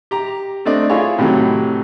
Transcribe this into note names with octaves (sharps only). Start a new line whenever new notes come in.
G4 A#5
A3 C4 D4 D5 D#5
E4 F4 G#4 C#5
A2 C3 D#3 E3 F#3